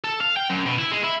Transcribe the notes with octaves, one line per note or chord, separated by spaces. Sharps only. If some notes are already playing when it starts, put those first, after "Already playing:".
A4
F5
G5
F#2
B2
E4
G#3
E4